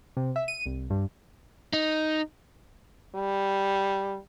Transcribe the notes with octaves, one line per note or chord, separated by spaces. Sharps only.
C3
E5
D#7
C2
G2
D#4
G3